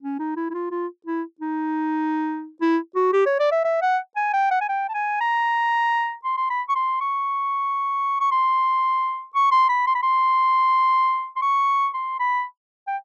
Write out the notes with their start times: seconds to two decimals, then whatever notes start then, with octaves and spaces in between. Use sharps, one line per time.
0.03 C#4
0.19 D#4
0.37 E4
0.51 E4
0.54 F4
0.71 F4
1.07 E4
1.41 D#4
2.62 E4
2.96 F#4
3.13 G4
3.26 C#5
3.40 D5
3.52 E5
3.65 E5
3.82 F#5
4.16 G#5
4.34 G5
4.51 F#5
4.61 G#5
4.69 G5
4.89 A5
4.94 G#5
5.21 A#5
6.24 C6
6.38 C6
6.50 B5
6.69 C#6
6.76 C6
7.01 C#6
8.20 C#6
8.32 C6
9.35 C#6
9.52 C6
9.69 B5
9.87 C6
9.95 B5
10.03 C6
11.36 C6
11.42 C#6
11.94 C6
12.20 B5
12.87 G5